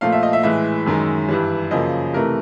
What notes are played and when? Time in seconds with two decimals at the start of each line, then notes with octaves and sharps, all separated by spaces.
0.01 A#2 F3 A3 F5
0.12 E5
0.23 D#5
0.33 E5
0.43 A2 E3 G#3 E5
0.86 F#2 D#3 G#3
1.29 G2 E3 G3
1.71 F#2 C#3 F3 A#3 D#5
2.13 C3 E3 A3 A#4